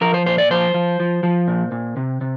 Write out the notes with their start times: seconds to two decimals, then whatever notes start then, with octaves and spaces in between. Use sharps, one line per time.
0.01 F3 A#4
0.14 C5
0.26 A#2 C5
0.38 D5
0.51 F3 C5
0.74 F3
1.00 F3
1.23 F3
1.48 A#2
1.72 A#2
1.97 C3
2.21 C3